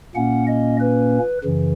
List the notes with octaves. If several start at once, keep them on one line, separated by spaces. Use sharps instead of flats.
A#2 A#3 C#4 F#5
D#5
B4
F#2 C#3 E3